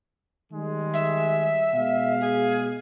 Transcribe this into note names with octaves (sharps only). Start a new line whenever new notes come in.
D#3 G3 G#3
E5
B2 G#3 F5
G#4